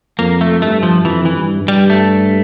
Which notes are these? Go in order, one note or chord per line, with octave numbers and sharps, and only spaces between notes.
F2 A#3
A3
G2 A3
F3
F2 E3
E3
G2
G2
G3
A3